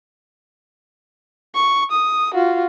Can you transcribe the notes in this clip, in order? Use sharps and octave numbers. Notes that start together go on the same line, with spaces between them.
C#6
D#6
F4 F#4